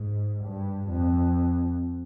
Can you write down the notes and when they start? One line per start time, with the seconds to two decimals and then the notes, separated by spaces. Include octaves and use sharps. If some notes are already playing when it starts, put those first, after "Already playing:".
Already playing: G#2
0.45 G2
0.89 F2